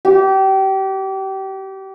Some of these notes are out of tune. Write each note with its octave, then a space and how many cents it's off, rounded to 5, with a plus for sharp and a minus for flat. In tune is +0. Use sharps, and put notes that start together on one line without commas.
G4 -30